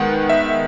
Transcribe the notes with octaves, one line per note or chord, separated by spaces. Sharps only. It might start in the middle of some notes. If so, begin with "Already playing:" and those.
Already playing: D#3 G#3 B3 F#5
E5